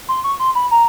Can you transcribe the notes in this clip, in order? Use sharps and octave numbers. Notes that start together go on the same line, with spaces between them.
C6
C#6
C6
B5
A#5